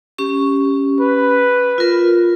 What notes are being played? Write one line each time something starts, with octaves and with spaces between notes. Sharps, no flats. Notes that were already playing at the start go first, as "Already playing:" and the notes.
C#4 G4 C#6
B4
F4 A#4